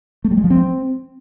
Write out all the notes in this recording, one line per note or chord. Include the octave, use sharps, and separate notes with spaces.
A3
G3
G#3
F3
C4